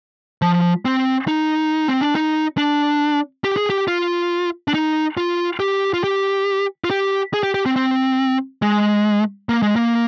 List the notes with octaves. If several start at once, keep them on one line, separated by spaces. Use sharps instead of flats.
F3
C4
D#4
C4
D4
D#4
D4
G4
G#4
G4
F4
D4
D#4
F4
G4
F4
G4
F4
G4
G#4
G4
G4
C4
C4
G#3
A#3
G#3
A#3